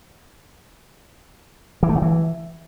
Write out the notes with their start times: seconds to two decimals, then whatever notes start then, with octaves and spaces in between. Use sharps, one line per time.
1.83 E3
1.89 A3
1.96 C#3
2.02 E3